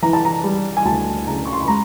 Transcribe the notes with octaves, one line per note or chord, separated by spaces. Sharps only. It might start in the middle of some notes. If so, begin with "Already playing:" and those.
E3 A#5
A5
A#5
G3
G#5
D2 A5
C#3 A#5
C#6
C6
B5
G#3 A#5